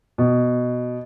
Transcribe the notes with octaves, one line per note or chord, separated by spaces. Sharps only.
B2